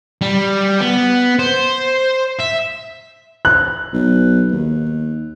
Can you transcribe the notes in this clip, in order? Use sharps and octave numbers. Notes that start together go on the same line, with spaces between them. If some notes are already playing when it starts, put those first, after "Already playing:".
G3
B3
C5
E5
F#6
B1
D#2